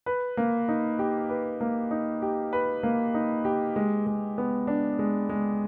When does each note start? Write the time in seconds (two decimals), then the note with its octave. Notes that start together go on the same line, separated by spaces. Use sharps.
0.06 B4
0.37 A#3
0.68 D#4
0.99 G4
1.29 B4
1.61 A#3
1.91 D#4
2.22 G4
2.53 B4
2.83 A#3
3.14 D#4
3.45 G4
3.76 G#3
4.07 G#3
4.38 B3
4.67 D4
4.99 G#3
5.29 G#3